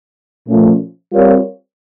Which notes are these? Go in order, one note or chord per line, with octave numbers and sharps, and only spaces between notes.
A#2 F3 A3 C#4 F4
G3 C4 F4 A#4 C#5